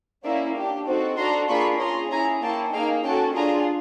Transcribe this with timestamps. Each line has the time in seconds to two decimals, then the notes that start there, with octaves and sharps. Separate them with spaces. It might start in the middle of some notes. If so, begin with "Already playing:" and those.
0.24 A#3 C#4 E4 D5 E5
0.55 D4 G4
0.87 C4 D#4 F#4 A4
1.18 D4 F#4 A4 A#5 C6
1.48 A#3 D4 F4 G#4 B5 C#6
1.79 C#4 F4 G#4 A#5 C6
2.11 C#4 E4 G#4 G#5 A#5
2.42 A#3 C#4 E4 G5 A5
2.73 A#3 D#4 G#4 F5 G5
3.04 C#4 F#4 A4 G5 A5
3.35 D4 F4 G#4 G#5 A#5